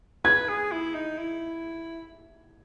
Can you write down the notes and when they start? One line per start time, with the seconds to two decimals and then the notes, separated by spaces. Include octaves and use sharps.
0.25 B4 G#6
0.48 G#4
0.72 E4
0.95 D#4
1.18 E4